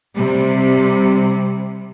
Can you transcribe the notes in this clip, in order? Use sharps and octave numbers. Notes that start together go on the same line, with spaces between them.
C3 G3